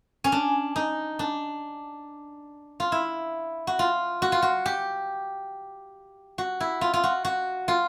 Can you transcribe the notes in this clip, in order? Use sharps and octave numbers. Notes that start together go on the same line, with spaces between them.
C#4
D4
D#4
D4
F4
E4
F#4
F4
F#4
F4
F#4
G4
F#4
E4
F4
F4
F#4
F#4
F4